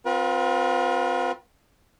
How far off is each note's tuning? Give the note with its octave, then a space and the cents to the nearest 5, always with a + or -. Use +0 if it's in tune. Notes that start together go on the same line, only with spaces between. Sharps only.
C4 -15 F4 +30 B4 -45